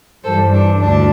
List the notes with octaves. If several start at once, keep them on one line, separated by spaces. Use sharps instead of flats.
G2 E3 G3 A4 C5
D4
D2 D4